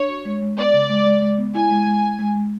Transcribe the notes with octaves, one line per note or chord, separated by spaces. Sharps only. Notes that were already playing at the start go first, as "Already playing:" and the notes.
Already playing: D4 C#5
F#4
G#3
G#3
B3 D5
C#3
G#3
G#3
G#3
B3
E4 G#5
G#3
G#3
G#3
G#3
G#3